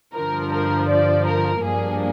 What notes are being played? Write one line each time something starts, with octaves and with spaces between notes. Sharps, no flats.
G2 D3 F3 A#4
A#4
D5
A#4
G2 F3 A#3 D4 G#4